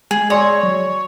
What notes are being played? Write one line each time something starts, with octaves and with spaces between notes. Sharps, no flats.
G#3 G#4
C#5 D5 C6 D#6 E6 A#6 C#7
F#3